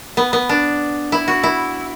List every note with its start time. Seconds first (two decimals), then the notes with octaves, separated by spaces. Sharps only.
0.17 B3
0.33 B3
0.49 D4
1.12 E4
1.28 F#4
1.44 E4